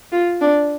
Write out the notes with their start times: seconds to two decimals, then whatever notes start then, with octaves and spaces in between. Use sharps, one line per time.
0.12 F4
0.41 D4